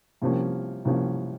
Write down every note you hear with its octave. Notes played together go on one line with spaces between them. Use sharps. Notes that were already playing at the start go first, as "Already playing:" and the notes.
C2 C3 F3 A#3 C#4
C2 C3 F3 A#3 C#4